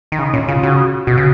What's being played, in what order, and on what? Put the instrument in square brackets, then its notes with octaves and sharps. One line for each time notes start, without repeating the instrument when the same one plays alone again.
[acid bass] D#3
[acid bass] C#3 [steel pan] D#4
[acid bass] A#2 [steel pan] C#4
[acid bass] C#3 [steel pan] F4
[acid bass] C#3 [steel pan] F#4
[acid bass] B2 [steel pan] F#4
[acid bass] C#3